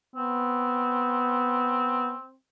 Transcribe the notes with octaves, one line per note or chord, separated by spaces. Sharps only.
B3 C4